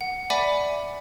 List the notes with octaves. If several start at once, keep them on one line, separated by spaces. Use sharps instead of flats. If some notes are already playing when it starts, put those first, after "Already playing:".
F#5
D5 E5 F#5 G#5 B5 D6